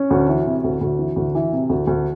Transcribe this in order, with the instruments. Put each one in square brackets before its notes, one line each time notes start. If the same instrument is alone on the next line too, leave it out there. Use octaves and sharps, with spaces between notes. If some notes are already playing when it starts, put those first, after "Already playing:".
Already playing: [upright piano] C#4
D2
E3
C3
D2
D2
E3
D2
E3
C3
D2
D2